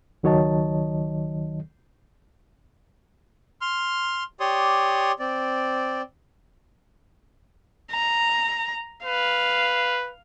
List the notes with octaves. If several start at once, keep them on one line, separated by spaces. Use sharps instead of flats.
C#2 D#3 F#3 C#5 D#5 A5
C6 F6
G4 C#5 D5 C6 D#6
C4 D5
A#5
B4 F5